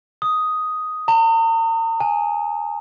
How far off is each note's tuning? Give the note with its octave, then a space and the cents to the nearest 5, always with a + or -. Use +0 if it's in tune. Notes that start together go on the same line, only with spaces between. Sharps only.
D#6 +5
A#5 -45
G#5 -5